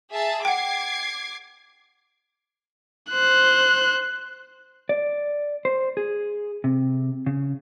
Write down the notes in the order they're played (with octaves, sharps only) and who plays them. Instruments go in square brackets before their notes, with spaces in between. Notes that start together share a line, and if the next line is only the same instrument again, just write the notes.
[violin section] G#4 E5 A5
[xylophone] F#5 G5 [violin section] D6 G#6 C7
[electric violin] C5 F#6
[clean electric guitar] D5
C5
G#4
C3
C#3